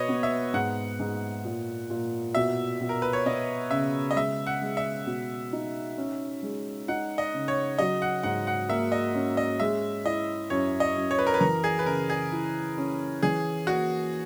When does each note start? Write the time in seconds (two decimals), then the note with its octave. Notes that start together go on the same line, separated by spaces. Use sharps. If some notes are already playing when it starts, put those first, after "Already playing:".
Already playing: B2 B4 C#5 D#5
0.09 B3
0.23 E5
0.53 G#2 F#5
0.99 G#2
1.45 A#2
1.90 A#2
2.35 B2 E5
2.80 B2
2.89 A#4
3.02 B4
3.13 C#5
3.26 B3 D#5
3.70 C#3 E5
4.11 D#5
4.16 G#3 E5
4.47 F#5
4.62 G#3
4.77 E5
5.07 B2
5.53 D#4
5.98 C#4
6.43 G#3
6.88 D#4 F#5
7.18 D#5
7.34 C#3
7.48 C#5
7.79 F#3 D#5
8.02 F#5
8.23 G#2 F#5
8.47 F#5
8.69 A#3 E5
8.92 D#5
9.14 C#4
9.37 D#5
9.60 G#3 E5
10.05 E4 D#5
10.50 F#2 C#5
10.80 D#5
10.96 F#2
11.11 C#5
11.19 B4
11.27 A#4
11.34 B4
11.40 E3 A#4
11.64 G#4
11.79 B4
11.86 C#3 A#4
12.10 G#4
12.32 E4
12.78 C#4
13.23 E3 G#4
13.67 A#3 F#4